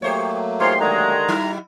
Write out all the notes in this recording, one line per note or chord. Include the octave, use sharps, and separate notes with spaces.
F#3 A3 A#3 G4 C5 C#5
G#2 F4 G4 A#4 C#5 C6
D3 D#3 G#3 A#5
F#3 D#4 E4